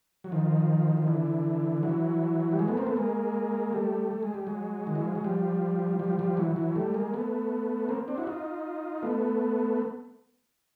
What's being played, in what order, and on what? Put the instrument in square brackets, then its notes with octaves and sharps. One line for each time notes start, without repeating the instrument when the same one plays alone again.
[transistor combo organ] F#3
D#3 F3
F3
D3 E3
E3 F#3
G3
F#3 G#3
A3 B3
A#3 C4
A3 B3
G#3 A#3
G3 A3
A3
G#3
G3
F#3 G#3
D#3
E3
F3
F#3
F3 G3
F3 G3
F3 G3
E3 F#3
E3 F#3
G3 A3
G#3 A#3
A3 B3
A#3 C4
C4 D4
E4 F#4
D#4 F4
A3 B3